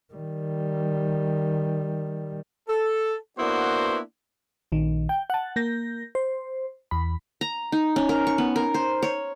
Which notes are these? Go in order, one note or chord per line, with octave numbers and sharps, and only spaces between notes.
D#3 G3
A4
A#3 B3 D4 E4 F#4 C5
A#1 D#3
G5
F#5 A5
A#3 G6 A#6
C5
E2 B5
A#5
D#4
C#4
A#4
C#6
B3
A#4
C5
C#5